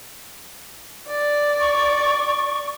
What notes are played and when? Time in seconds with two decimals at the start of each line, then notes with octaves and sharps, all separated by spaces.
1.07 D5
1.60 C#6